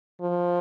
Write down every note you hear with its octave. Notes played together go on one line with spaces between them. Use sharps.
F3